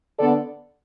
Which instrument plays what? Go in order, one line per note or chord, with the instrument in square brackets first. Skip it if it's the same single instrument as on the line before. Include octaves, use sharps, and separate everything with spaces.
[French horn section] D3 B3 D4 A4 D5